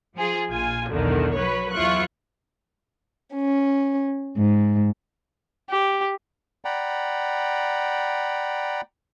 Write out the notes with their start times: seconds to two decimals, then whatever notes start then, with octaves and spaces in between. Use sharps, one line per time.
0.16 F3 F4 G#4
0.50 A#1 F4 G#5
0.90 B1 E2 D3 D#3
1.36 F#3 B4 C#5
1.73 E2 F#3 E4 F4 C#6 F#6
3.34 C#4
4.38 G#2
5.70 G4
6.65 D5 F#5 G5 A#5 B5